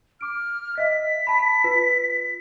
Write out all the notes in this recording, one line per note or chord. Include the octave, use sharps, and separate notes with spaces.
D6 F6 D7
D#5 E5 B6
A5 B5
F4 B4